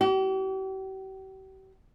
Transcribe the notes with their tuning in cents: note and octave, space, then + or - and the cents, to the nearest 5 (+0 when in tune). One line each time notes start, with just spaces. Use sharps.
G4 -45